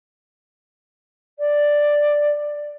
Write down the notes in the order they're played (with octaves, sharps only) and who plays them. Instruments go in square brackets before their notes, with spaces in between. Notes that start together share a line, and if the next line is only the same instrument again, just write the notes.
[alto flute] D5